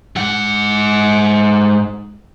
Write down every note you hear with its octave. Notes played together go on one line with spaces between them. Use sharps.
G#2 F#5